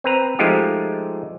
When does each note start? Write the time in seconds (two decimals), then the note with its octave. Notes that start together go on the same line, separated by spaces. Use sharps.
0.04 C4 B4 A#5
0.39 F3 G#3 A3 D#4 F4 G4